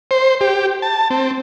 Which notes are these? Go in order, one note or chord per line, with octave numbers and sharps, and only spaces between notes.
C5
G4
A5
C4